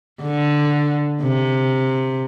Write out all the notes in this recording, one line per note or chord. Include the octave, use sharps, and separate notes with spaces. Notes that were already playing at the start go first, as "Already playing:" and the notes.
D3
C3